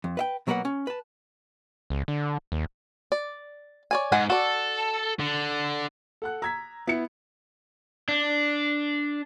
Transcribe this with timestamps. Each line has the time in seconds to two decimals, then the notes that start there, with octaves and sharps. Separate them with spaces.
0.04 F2
0.17 B4 E5 G5
0.47 B2 F#3 A#3 A#4 B4 F#5
0.65 C#4
0.87 B4 A5
1.90 C#2
2.08 D3
2.52 D#2
3.12 D5
3.91 C#5 D5 G#5
4.12 G#2 G#3 F#5 G#5
4.30 F#4 A4 D5
5.20 D3
6.22 A4 F#5 F#6
6.42 A#5 E6 G#6 B6
6.87 B3 E4 C#7
8.08 D4